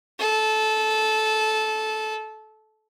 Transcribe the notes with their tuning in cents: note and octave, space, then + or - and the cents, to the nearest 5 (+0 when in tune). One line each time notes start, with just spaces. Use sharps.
A4 -15